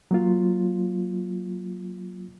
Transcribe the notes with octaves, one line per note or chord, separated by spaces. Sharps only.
F#3 A#3 F4